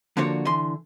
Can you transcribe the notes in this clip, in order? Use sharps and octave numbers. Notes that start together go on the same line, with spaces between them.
D3 F3 A#3 D4 F#4 C#5
D3 E3 C6